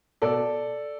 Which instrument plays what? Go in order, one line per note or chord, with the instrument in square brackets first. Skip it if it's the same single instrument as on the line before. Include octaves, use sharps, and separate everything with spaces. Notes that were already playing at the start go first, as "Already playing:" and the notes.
[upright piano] B2 A4 D5